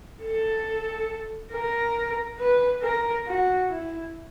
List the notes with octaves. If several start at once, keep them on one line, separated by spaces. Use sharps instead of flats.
A4
A#4
B4
A#4
F#4
E4